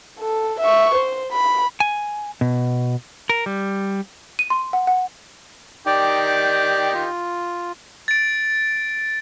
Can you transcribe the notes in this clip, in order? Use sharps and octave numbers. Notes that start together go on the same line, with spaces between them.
A4
E5 C#6
C5
B5
G#5
B2
A#4
G3
D#7
C6
F#5
F#5
D#3 D#4 G4 D5 G5 D6
F4
A6 D7